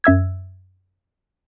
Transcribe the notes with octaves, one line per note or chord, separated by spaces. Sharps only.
F#2 E5 E6 G#6